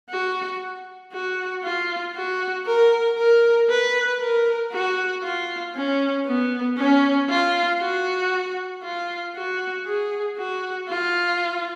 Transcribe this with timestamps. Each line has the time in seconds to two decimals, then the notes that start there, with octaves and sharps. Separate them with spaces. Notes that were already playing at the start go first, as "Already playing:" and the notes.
0.09 F#4
1.13 F#4
1.64 F4
2.16 F#4
2.67 A#4
3.18 A#4
3.70 B4
4.20 A#4
4.72 F#4
5.24 F4
5.75 C#4
6.27 B3
6.78 C#4
7.30 F4
7.81 F#4
8.84 F4
9.36 F#4
9.86 G#4
10.38 F#4
10.89 F4